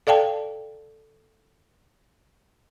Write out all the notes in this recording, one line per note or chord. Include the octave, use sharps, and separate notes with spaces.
A4 D5 F5 G5 A5